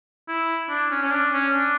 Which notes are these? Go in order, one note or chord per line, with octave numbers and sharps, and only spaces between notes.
E4
D4
C#4
C#4
D4
C#4
D4